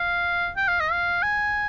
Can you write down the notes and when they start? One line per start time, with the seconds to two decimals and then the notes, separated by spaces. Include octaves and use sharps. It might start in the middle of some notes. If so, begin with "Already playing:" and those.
Already playing: F5
0.56 G5
0.68 F5
0.80 D#5
0.92 F5
1.23 G#5